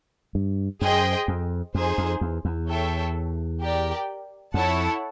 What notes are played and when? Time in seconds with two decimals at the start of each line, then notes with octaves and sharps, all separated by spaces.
0.35 G2
0.81 F#2 G#4 C5 D#5 G5
1.28 F2
1.74 F2 D#4 G#4 C5
1.98 F2
2.21 E2
2.45 E2
2.68 E4 A4 C#5 E5 G5
3.61 G4 A#4 D5 G5
4.54 F2 E4 A4 C#5 F#5 A5